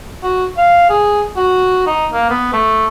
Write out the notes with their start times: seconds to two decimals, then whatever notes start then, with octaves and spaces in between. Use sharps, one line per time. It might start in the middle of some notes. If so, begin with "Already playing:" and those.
0.23 F#4
0.57 F5
0.89 G#4
1.37 F#4
1.87 D#4
2.12 A#3
2.30 B3
2.53 A3